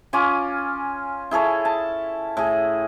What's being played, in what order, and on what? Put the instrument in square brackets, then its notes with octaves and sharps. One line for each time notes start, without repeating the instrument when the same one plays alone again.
[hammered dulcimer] C#4 F4 G#5 D6
E4 G#4 A4 C#5
A5
A2 G#4